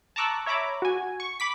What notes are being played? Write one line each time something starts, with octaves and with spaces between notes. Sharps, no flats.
A5 A#5 C#6 D6 E6 F#6
C#5 E5 A#5 B5 D6
F#4 G#5
C#6
B5 D6 B6